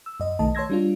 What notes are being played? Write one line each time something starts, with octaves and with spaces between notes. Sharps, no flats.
E6
F#2 D#5
B1 D#3 A3 D#5 A5
C#5 A5 C6 E6 G#6 A#6
G3 D4 F4